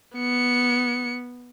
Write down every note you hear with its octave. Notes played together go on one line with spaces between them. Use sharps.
B3 C#7